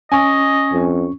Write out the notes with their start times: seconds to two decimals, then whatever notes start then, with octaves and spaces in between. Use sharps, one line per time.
0.12 C#4 D#5 G#5 C#6
0.72 F2